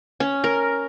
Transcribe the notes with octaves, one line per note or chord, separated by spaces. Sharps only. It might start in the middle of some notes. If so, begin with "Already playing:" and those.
C#4
A#4